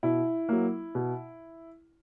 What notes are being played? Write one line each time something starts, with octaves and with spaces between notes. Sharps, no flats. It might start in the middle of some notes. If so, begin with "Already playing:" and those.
B2 E4
F#3 A#3
B2